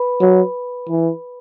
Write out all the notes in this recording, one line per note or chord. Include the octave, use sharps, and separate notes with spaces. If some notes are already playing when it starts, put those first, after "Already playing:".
Already playing: B4 B5
F#3
E3